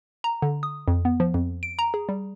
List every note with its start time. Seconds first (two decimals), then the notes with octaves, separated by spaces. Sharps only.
0.24 A#5
0.42 D3
0.63 D#6
0.88 F2
1.05 B3
1.20 F3
1.34 F2
1.63 D7
1.79 A#5
1.94 G#4
2.09 G3